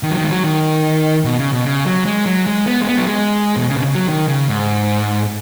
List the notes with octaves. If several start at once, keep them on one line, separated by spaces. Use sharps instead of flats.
D#3
F#3
D#3
G#3
F#3
D#3
B2
C#3
B2
C#3
F#3
G#3
F#3
G#3
B3
G#3
B3
F#3
G#3
B2
C#3
B2
C#3
F#3
D#3
C#3
G#2